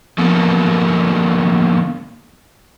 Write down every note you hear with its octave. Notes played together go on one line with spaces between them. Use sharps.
D3 F3 A#3 B3 A4